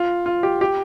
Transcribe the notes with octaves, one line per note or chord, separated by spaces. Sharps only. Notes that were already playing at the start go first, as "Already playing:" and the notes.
Already playing: F4
F4
G4
G4